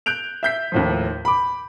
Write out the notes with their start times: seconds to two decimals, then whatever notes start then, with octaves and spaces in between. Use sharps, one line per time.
0.06 F#6 G6 D7 F7
0.43 E5 G6 B6
0.72 D#2 A2 F3
1.25 B5 D6